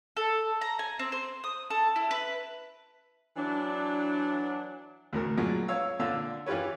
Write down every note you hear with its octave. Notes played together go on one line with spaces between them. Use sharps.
A4
A#5
G#5
C4
C5
D#6
A4
E4
B4
E3 F#3 D4
D2 A2 A#4
A#2 F3 F#3 G#3
C#5 F5 E6
A#2 D3 D4 F5 E6
E3 F4 G4 B4 C#5